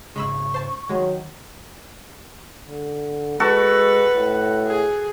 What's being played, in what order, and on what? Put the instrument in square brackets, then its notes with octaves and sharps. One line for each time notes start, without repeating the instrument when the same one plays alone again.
[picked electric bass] G#1 C#3 [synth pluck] G#3 B5 E6 [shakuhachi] C#6
[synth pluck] C5 A5
[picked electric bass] D#3 [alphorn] F#3 [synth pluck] G#3
[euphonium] D3
[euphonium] G#3 [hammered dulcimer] F#4 A4 C#6 [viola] B4
[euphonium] A2
[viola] G#4